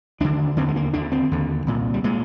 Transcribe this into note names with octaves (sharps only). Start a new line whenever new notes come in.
D#2 D3 D4
D#2 D3 C4
G#3
A#3
D#2 D3 D4
C4
D#2 D3
C2 A#2
G3
A#2 G#3